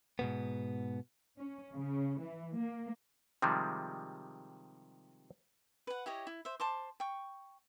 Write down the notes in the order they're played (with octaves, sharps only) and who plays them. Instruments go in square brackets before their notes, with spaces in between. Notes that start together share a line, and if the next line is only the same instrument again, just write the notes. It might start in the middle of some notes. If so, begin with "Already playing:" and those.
[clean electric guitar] G#2 B2 B3
[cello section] C#4
C#3
E3
A#3
[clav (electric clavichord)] C3 D#3 F3 G3 G#3
[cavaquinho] B4 F#5
E4 G4 C#5 D#5
E4
C5 E5
C5 A5 C6 D6
G5 C#6